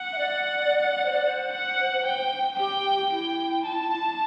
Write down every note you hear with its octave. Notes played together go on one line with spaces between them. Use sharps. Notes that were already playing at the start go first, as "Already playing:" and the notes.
Already playing: F#5
E5
D5
D5
C5
D5
C5
F#5
G5
G4 G5
E4 G5
A5